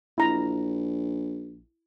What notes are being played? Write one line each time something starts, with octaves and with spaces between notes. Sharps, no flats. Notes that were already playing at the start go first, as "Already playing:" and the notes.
A#1 E4 A#5